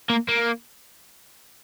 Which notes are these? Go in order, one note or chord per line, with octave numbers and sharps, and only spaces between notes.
A#3
A#3